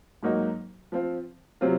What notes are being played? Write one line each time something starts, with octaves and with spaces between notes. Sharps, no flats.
G#2 F#3 A#3 D#4 F#4
F3 C4 F4
C3 F#3 C4 F4